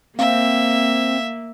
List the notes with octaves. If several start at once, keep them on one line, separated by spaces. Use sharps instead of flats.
A#3 C4 E5 F5